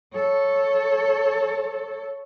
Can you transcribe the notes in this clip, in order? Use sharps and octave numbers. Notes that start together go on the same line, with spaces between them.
A4 C#5